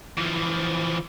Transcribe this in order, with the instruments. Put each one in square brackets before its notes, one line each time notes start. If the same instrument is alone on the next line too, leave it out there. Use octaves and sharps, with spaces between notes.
[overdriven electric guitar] E3 F3